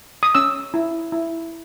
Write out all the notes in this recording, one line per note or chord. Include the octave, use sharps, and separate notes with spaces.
D#6
C#4 E6
E4
E4